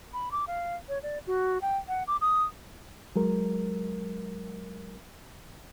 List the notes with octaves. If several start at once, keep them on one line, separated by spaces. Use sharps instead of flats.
B5
D6
F5
C#5
D5
F#4
G5
F#5
D6
D#6
F#3 G#3 A#4